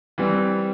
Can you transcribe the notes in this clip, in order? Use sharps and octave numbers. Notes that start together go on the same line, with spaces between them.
E3 G3 C4